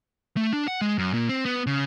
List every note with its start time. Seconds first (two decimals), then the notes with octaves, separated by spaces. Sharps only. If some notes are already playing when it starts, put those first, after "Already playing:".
0.37 A3
0.53 D4
0.68 F#5
0.81 G#3
0.98 F#2
1.14 A#2
1.29 C4
1.45 B3
1.67 C#3